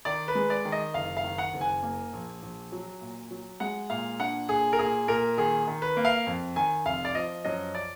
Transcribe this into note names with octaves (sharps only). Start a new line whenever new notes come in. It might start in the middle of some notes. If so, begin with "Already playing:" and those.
D#3 D5
B4
G#3
D5
D#3
D#5
F#1 F5
F5
D#3
F#5
F#1
G#5
A#3
A#1
A#1
F#3
A#2
F#3
G#3 F#5
A#2 F5
D4 F#5
A#2 G#4
A#4
A#2 G#4
A#2 A#4
D#3 G#4
D#3
B4
A#3
F5
F2
D#3 G#5
F1 F5
D5
F3 D#5
F#2 D#5
D5